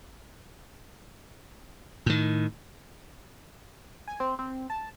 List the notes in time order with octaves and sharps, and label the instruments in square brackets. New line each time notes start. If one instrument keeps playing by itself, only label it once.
[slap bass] A2 D#3
[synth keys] G#5
C4
C4
A5